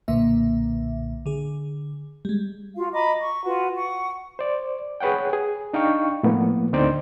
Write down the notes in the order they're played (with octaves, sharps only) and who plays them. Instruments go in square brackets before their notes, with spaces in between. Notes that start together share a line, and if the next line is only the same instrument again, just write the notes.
[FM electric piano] B1 A#2 D3 A#3 E5
D3 G#4
G3 G#3
[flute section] F4 F#4 F5
D#5 A#5 B5 D6
C#6
F4 F#4 B4 F#5
F#5 C#6
[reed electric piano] C5 D5
G#4 B4 C#5 F#5 G5
G#4
D4 D#4 F5 G5 C#6
A2 F3 A#3 B3
D2 D3 C4 D#4 C5 D5